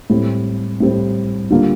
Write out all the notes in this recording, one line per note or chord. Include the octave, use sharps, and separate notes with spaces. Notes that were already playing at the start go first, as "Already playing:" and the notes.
A2 G3 C4
A2 G3 C4
D3 G3 A#3 F4